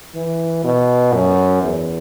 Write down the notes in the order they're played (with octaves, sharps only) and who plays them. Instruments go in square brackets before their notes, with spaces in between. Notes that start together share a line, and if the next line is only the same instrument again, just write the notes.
[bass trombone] E3
B2
F#2
E2